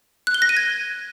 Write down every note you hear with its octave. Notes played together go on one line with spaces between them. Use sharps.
F#6
G7
A#6
D#7
G#6